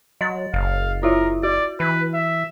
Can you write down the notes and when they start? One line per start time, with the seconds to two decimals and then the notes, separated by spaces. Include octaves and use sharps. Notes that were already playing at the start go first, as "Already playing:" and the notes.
0.21 F#3 D#5 A6
0.54 F#1 F5
1.03 E4 F4 A#4 E5
1.43 F#4 D5
1.80 E3 B4
2.14 E5